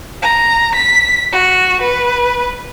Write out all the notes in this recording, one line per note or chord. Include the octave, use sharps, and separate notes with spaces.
A#5
B6
F#4
B4